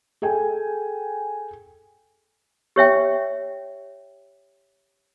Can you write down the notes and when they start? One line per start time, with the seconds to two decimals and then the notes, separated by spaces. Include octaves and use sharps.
0.22 G#4 A4 G5 G#5
2.76 G4 C#5 E5 G5